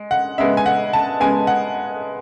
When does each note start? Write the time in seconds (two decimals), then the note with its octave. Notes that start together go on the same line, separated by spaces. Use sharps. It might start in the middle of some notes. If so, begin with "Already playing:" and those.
Already playing: G#3
0.11 F#5
0.38 C#3 G#3 B3 E5
0.57 G#5
0.66 F#5
0.93 A5
1.20 C#3 G#3 B3 G#5
1.47 F#5